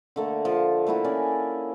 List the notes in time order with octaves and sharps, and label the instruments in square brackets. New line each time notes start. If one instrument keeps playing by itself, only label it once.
[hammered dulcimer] D3 A3 A#3
F3 A3
A3 A#3 E4 F#4
C#4 G#4 A#4 D5